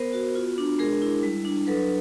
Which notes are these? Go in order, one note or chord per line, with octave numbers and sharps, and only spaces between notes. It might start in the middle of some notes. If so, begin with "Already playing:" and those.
Already playing: B3 A#4 C5
F#4
F4
D4
G#3 G#4 A#4
E4
G3
D4
F#3 A4 B4